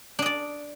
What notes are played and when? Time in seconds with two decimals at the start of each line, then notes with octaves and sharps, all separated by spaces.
0.19 D4
0.22 D#5
0.26 D5